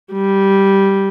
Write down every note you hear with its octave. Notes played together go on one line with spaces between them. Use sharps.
G3